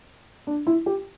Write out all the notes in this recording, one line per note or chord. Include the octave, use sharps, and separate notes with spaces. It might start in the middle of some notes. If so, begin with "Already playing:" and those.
D4
E4
G4